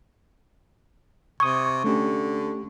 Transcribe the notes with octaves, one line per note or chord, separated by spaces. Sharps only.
C3 C#6 D#6 G#6
D3 A3 C#4 G4